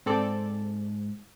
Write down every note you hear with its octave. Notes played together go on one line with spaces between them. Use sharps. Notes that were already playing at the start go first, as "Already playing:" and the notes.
G#2 C4 A4 D5